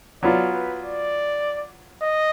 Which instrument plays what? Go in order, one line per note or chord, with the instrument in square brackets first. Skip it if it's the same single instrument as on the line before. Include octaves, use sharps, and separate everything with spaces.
[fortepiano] F#3 B3 F4 [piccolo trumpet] D5
[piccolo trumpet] B4
D5
D#5